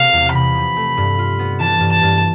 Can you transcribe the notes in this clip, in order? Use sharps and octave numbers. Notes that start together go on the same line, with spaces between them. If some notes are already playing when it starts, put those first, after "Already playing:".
Already playing: C3 F5
E2
C3 B5
F3
A3
G2
F4
B3
E3 A5
G2
A5
G2